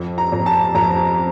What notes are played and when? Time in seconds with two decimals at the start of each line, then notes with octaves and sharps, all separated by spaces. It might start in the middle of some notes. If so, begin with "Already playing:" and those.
Already playing: F2
0.18 A#5
0.32 F2
0.46 A5
0.75 F2 A#5